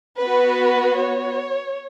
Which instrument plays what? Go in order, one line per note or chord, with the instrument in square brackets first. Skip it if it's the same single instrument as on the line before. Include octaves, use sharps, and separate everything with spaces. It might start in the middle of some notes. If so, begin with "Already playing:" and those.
[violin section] B3 F#4 B4
C#5